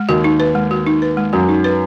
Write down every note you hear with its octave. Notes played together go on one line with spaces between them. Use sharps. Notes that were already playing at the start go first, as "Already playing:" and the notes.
Already playing: G#3
D#2 D#3 F#4
D#4
B4
G#3
F#4
D#4
B4
G#3
F#2 F#3 F#4
D#4
B4